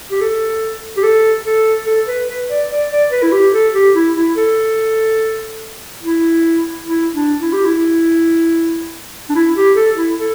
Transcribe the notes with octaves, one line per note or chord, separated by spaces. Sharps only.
G4
A4
G4
A4
A4
A4
B4
B4
D5
D5
D5
B4
E4
G4
A4
G4
E4
E4
A4
E4
E4
D4
E4
G4
E4
D4
E4
G4
A4
E4
A4